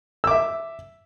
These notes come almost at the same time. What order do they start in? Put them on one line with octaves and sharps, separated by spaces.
E6 D6 E5